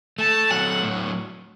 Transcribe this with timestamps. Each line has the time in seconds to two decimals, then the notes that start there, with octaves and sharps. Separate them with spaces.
0.19 A3 A5
0.50 F#3 F#5
0.83 A2